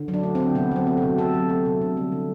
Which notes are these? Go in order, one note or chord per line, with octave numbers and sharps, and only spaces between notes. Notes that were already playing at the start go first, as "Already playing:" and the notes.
Already playing: D3
F#3
D4
A3
D3 C4
C3 B3
F#3 C4
A3
C3 F#4
C3 A4
F#3
A3
C3
D3
G3
D3